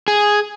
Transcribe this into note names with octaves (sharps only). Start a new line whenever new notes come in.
G#4